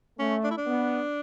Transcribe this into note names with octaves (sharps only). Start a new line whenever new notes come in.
A3 C#4
D4
E4
D4
B3